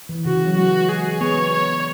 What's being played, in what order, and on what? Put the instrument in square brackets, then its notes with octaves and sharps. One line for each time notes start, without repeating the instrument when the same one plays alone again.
[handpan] E3
[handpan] C#3 [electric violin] F#4
[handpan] E3
F#3
[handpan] G#3 [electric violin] F#4
[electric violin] G#4
[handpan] B3 [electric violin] C#5
[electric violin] C#5